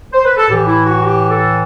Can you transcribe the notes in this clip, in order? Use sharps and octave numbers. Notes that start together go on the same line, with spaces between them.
C5
B4
A4
A2 E3 G4
E4
F#4
G4
A4